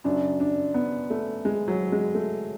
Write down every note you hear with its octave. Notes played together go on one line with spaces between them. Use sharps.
F#2 C#3 F#3 D4
D4
B3
A3
G#3
F#3
G#3
A3